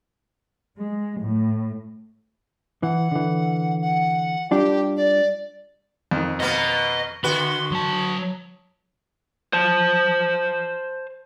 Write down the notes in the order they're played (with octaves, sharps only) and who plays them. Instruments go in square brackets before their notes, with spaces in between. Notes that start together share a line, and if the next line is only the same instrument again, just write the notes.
[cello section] G#3
A2
[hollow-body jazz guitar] E3 [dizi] F#5
[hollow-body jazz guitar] D3 E3
[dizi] F#5
[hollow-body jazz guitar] G3 D4 F4 [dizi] G4
[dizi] D5
[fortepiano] F2 D#3
[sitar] B2 A#3 B3 [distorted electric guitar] D#5
[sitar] D3 F#4 [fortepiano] B4 [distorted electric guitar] C6
[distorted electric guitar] F#3 A5
[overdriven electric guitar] C5 A5